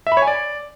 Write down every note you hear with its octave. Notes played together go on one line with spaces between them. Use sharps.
E5
B5
C#5
G#5
D5